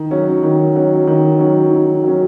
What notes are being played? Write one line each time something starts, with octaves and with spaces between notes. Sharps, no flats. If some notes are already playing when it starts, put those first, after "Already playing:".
Already playing: D#3
F#3 C#4
D#3
F#3 C#4
D#3
F#3 C#4
D#3
F#3 C#4